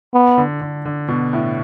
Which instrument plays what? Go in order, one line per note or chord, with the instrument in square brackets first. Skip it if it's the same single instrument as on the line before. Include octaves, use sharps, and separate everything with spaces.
[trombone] B3
[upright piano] D3
D3
D3
B2
A2